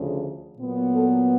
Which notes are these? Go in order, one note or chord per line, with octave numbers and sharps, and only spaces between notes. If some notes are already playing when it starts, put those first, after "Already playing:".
Already playing: D2 C#3 F3
A#2 F#3 B3
A4